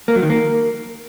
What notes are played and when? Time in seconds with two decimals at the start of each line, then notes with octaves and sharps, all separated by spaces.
0.08 A#3
0.15 F#3
0.22 D#3
0.30 A#3